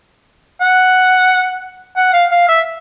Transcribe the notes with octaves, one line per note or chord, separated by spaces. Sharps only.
F#5
F#5
F5
F5
E5